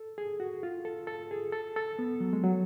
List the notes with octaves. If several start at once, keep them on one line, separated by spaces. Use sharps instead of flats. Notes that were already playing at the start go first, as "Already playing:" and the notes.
Already playing: A4
G#4
F#4
F4
A4
A4
G#4
A4
A4
B3
F#3
G#3
F#3